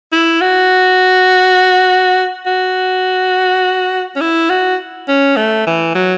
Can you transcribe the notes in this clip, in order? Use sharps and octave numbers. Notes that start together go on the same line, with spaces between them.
E4
F#4
F#4
C#4
E4
F#4
C#4
A3
E3
F#3